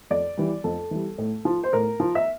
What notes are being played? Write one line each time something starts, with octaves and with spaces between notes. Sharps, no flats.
F2 D5
E3 G3
F2 A4
E3 G3
A2
F3
C5
A2 A#4
F3
E5